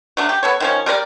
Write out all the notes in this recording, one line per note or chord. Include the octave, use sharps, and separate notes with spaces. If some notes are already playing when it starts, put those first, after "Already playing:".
F#3 A3 D4
G4
B3 A4 C#5
D#3 F3 C#4
G3 A#4 B4 D5